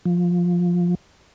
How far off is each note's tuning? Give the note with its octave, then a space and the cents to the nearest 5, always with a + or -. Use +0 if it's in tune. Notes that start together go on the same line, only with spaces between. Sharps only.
F3 +10